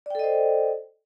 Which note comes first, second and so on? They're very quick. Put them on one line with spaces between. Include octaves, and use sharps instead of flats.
D5 G5 A4 D#5 C5